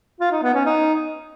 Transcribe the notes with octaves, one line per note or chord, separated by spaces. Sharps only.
F4
D#4
B3
C#4
D#4